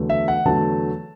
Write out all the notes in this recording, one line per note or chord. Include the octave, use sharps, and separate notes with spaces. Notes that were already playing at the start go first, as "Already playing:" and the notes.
Already playing: E2 D3 F#3 A3
E5
F#5
E2 D3 F#3 A3 A5